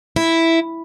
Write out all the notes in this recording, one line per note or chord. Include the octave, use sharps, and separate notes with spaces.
E4